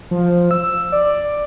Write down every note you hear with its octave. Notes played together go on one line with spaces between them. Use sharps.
F3
E6
D5